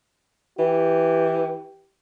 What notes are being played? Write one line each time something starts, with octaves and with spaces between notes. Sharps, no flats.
E3 G4